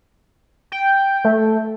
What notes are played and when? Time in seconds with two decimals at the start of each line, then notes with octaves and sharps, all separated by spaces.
0.72 G5
1.25 A3